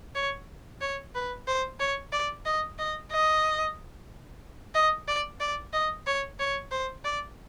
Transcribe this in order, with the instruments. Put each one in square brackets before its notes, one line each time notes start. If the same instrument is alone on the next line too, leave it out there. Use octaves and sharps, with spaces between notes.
[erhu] C#5
C#5
B4
C5
C#5
D5
D#5
D#5
D#5
D#5
D5
D5
D#5
C#5
C#5
C5
D5